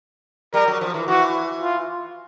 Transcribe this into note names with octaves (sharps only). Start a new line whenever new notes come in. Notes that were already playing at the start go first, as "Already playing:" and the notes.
G3 A#4
F#3
F3
E3
E3 F#4
F4